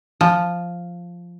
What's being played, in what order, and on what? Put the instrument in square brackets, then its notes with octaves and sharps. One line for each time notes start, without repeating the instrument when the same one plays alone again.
[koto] F3